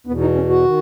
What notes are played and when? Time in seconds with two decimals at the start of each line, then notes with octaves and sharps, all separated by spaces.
0.07 E2 B3
0.11 B2
0.21 D#4
0.35 C#4
0.49 F#4
0.65 D#3